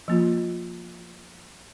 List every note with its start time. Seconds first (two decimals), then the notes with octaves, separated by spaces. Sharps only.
0.08 F3 A#3 F4